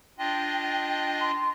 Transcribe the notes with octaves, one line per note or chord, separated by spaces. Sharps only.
D4 F4 D#5 G5
C6